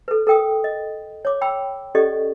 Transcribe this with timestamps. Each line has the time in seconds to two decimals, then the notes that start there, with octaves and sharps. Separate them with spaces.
0.08 A4 B4
0.27 A4 A#4 G5 D#6
0.64 D#5
1.25 C#5 D6
1.41 G5 B5 E6
1.95 C#4 G4 A4 D5 D#5 C#6